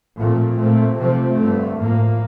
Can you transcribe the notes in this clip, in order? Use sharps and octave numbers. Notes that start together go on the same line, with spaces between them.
A#2 F3 A3 C4
A#2 A3 C4
C3 F3 A3 C4
G2 D3 A3
A2 F3 A#3